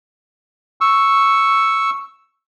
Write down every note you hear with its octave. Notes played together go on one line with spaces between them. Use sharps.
C#6 E6